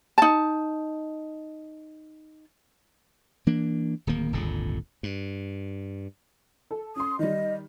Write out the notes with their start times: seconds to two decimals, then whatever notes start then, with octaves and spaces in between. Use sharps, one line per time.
0.18 D#4 A5
3.47 E3 A#3 D4
4.07 D1 D#3 A#3
4.32 D#1 G#1 A#2 D3
5.03 G2
6.71 A4
6.96 C#4 C6 D#6
7.19 D#3 G3 D#5